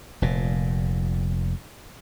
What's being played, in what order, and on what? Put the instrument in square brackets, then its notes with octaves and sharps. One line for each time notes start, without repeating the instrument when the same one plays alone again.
[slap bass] F1 A#2